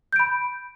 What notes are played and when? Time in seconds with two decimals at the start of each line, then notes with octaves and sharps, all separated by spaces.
0.13 G6
0.16 D7
0.19 B5